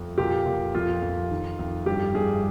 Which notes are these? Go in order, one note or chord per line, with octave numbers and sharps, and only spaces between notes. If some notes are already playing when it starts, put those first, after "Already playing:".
Already playing: F2
A#2 G4
A#2
F2 F4
F2
D#3
F2
G2 G4
G2 G#4